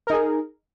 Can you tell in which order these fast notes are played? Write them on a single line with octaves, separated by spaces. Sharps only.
A#4 D#4 G#4